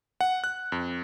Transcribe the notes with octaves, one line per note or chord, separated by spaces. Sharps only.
F#5
F#6
F2